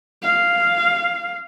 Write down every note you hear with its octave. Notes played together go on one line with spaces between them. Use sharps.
F5